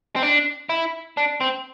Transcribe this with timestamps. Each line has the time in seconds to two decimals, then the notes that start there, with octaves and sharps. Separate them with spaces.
0.16 C4
0.23 D4
0.69 E4
1.17 D4
1.41 C4